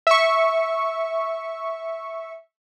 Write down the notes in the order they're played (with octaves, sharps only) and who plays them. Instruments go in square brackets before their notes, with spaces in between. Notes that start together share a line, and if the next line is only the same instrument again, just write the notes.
[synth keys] E5 C#6